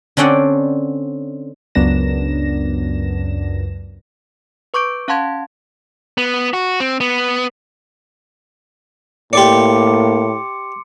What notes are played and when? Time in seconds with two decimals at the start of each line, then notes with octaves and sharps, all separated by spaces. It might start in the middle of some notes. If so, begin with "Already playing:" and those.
0.17 D3 C4 C#4 D5 F#5 G5
1.75 C#2 F#2 B3 D4 A#6 E7
4.74 B4 C#6 D6 G6 D7
5.08 C#4 F5 F#5 A5 C6 G#6
6.18 B3
6.54 F#4
6.80 C4
7.00 B3
9.33 A2 A#3 G4 D5 C6 D6 C#7